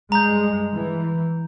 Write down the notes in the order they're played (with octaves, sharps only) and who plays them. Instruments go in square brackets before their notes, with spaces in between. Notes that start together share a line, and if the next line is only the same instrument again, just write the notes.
[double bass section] G2 G#3 [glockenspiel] A#5 G6
[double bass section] E3